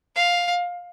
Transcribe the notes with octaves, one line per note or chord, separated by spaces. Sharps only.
F5